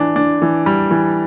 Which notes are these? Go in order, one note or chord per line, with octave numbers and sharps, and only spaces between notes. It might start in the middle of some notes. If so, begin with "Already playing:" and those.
Already playing: E3 D4
D4
E3
G3
E3